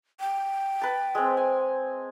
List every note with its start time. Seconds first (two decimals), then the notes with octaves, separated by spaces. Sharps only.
0.20 G5
0.82 B4 A5
1.15 G#3 C4
1.37 G#5